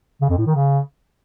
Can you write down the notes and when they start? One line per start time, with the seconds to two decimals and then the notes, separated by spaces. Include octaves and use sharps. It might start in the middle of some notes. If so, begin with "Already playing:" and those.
0.21 C#3
0.30 F2
0.38 A2
0.46 D#3
0.55 C#3